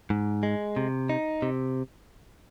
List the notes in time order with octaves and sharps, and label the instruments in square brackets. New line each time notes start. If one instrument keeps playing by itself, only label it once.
[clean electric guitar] G#2
G#3
C3
D#4
C3